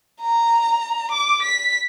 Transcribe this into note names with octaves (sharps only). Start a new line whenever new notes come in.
A#5
D6
B6